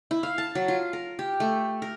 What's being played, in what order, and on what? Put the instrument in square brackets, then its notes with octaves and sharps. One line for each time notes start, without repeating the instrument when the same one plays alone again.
[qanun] E4
F5
A5
F#3
F4
A#4
G4
A3
A#4